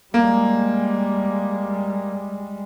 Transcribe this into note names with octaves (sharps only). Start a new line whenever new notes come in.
G3 G#3 A#3